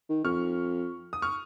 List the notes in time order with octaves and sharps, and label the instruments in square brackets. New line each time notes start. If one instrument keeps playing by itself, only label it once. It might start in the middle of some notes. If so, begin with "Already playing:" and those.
[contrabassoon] D#3
[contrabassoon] F2 [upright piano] C#6 F6
[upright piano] D#6
C#6 F6